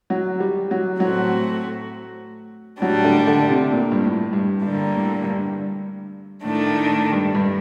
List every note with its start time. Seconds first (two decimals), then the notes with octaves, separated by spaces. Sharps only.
0.10 F#3
0.40 G3
0.71 F#3
1.00 A2 F#3 A3 C4 F#4
2.82 A2 F#3 G3 D4
3.04 D3
3.27 D3
3.49 C3
3.72 A#2
3.92 G2
4.03 A2
4.33 G2
4.62 G2 D3 G3 A#3
4.93 A2
5.24 G2
6.44 A2 D#3 A3 D4
6.66 A2
6.89 A2
7.12 G2
7.35 G2